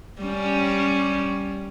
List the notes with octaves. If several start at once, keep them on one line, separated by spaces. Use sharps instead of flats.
G3 C#4